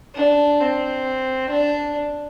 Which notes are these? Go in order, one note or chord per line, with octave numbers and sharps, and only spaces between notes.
D4
C4
D4